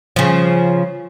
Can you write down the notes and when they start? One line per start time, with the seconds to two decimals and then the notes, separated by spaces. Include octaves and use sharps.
0.16 C#3 F3